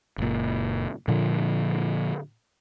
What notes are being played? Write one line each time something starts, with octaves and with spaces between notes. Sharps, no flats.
F#1 A#2
A#2 D3 F3